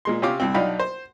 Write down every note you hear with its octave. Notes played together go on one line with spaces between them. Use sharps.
A#2 G#3 C6
C3 C4 C#4 F4 D6
C2 C4
B1 D4 D#4 F4 G5 B5
C5